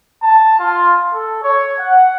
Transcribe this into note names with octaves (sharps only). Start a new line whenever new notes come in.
A5
F4
A4
C#5
F#5